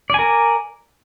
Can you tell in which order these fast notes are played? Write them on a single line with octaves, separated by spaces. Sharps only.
D5 G#5 A#4